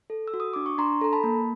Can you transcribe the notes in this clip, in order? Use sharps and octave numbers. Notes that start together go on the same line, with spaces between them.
A4
E6
F#4
D#6
D4 D6
C#6
D4 A#5 C6
A4 A#5
A5 B5
A#3